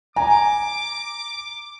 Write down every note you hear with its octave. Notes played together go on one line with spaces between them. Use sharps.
G#5 A#5 D6